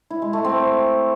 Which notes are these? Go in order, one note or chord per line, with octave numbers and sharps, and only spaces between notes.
E4
G#3
A3
C4